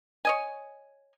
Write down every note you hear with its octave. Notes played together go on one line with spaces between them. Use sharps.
C#5 D#5 G#5